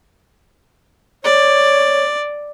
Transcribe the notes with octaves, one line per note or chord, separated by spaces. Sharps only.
C#5 D5